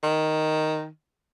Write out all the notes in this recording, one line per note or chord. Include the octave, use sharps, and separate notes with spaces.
D#3